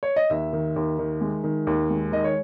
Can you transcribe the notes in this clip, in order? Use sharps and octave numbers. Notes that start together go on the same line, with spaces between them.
C#5
D#5
D#2 E5
D#3
D#2
D#3
G#3
D#3
D#2
G#3
D#3 D#5
C#5